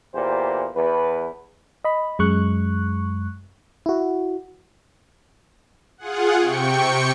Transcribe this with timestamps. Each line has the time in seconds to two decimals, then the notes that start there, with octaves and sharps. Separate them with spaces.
0.13 E2 A#2 G4 C5
0.75 E2 B4
1.84 D#5 B5
2.19 F#2 G#3 C#6 F#6
3.86 E4 F#4
5.98 F4 G#4 F#5
6.39 C3 G5 C#6 C#7